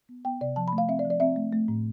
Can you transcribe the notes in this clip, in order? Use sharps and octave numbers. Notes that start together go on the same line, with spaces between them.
B3
B3 G5
C3 D5
F3 A5
B5
A3
F5
C4 E5
D5
F3
D5
C4 E5
A3
A3
A2